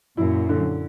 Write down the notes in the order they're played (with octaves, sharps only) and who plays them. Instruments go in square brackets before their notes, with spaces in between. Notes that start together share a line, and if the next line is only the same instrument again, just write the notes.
[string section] F#2 A#2 [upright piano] E4
[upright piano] D3